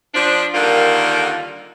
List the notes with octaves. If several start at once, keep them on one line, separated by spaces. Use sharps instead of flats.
F3 D4
D3 D#3 G3 A#3 F4 A#4